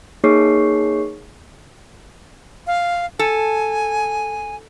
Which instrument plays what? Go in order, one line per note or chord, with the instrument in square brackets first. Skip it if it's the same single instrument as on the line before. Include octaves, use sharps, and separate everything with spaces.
[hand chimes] A#3 D#4 G#4 C#5 C#6 C7
[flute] F5
[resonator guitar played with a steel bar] A4 [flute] G#5